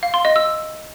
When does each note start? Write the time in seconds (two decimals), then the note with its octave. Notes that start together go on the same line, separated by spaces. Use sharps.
0.03 F5
0.14 C6
0.25 D#5
0.36 E6